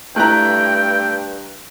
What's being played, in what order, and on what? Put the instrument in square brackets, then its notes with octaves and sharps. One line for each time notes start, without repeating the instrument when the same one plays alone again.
[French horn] G2 [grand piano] A3 E4 [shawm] G5 [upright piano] A#5 F#6